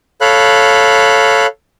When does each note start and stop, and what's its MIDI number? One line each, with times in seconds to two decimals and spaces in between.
0.21 1.46 69
0.21 1.46 73
0.21 1.46 77
0.21 1.46 83
0.21 1.46 90